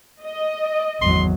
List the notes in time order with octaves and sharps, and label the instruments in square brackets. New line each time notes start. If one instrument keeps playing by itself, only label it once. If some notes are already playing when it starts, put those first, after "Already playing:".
[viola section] D#5
[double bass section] G#1 E2 F#3 [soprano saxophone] C6